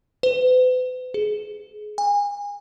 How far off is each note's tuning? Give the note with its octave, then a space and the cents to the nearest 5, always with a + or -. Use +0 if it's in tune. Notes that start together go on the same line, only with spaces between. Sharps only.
B4 +45
G#4 +25
G#5 -30